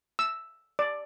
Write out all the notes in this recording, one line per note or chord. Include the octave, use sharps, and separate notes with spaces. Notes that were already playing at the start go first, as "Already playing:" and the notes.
E6
D5